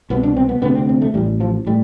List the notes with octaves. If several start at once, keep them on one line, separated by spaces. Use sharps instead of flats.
C2 B2 B3
D4
C4
B3
D2 C3 B3
C4
C4
A3
A1 A2 G3
F3
A2 G3